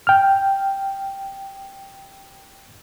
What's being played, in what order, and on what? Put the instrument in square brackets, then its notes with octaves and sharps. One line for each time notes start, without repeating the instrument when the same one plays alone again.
[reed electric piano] G5 F6